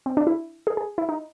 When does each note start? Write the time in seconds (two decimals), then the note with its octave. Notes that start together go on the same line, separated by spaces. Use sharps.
0.06 C4
0.17 D4
0.27 E4
0.67 G#4
0.77 G#4
0.98 E4
1.09 D#4